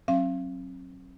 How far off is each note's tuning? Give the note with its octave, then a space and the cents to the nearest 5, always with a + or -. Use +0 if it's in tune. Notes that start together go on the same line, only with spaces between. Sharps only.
F#3 +0 C4 +45 F5 -35